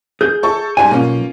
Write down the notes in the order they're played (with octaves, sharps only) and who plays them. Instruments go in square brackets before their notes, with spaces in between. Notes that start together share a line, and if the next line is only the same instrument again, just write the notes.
[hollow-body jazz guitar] G#4 [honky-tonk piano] G6
[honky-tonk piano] A4 C#6
[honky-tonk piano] G#2 G3 D#7 [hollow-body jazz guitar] G#5
[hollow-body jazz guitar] B1 [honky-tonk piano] A#3 C#4 F4